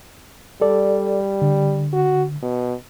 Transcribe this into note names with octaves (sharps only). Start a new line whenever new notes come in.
G3 A4 D5
D3
F#4
B2